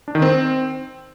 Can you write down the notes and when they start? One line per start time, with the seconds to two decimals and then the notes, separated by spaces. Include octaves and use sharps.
0.08 D4
0.15 D#3
0.22 C4